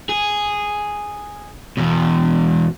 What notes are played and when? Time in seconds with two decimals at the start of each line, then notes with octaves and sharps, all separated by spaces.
0.09 G#4
1.77 E2 B2